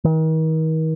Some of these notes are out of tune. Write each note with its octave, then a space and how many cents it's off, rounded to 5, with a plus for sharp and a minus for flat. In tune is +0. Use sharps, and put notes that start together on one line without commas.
D#3 +40